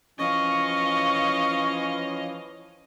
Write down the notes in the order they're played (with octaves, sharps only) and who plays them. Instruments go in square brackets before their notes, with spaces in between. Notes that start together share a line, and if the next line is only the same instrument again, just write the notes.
[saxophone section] E3 F3 C#4 [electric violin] D#5 F5 [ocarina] C#6